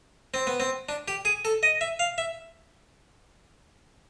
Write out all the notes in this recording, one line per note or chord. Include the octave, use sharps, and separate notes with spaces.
C4
B3
C4
D4
G4
G#4
A4
D#5
E5
F5
E5